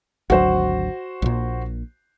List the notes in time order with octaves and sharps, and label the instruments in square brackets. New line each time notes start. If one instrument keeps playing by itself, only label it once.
[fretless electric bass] G#1 D2 F#3 [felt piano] F#4 C5
[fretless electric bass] A#1 A#2